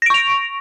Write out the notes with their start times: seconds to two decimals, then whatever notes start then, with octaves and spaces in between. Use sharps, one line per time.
0.02 A#6
0.06 D7
0.10 C#6
0.14 F7